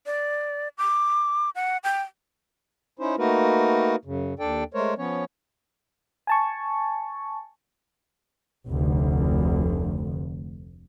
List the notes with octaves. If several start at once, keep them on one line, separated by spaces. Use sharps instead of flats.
D5
D6
F#5
G5
C#4 D#4 E4 C5
A3 A#3 D#4 F#4 A#4 B4
F#2 C#3
D#2 D4 A4 D5 G5
G#3 A3 A#4 C5 C#5
F3 B3 C#4 C#5
G#5 A5 C#6
F1 D2